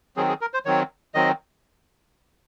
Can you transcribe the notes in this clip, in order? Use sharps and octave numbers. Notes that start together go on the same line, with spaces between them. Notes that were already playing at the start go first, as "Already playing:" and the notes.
D#3 F#3 C4 G#4
G#4
A#4
C5
D#3 F#3 C4 C#5
D#3 F#3 C4 D#5